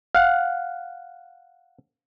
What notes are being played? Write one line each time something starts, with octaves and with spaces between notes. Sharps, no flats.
F5 F#5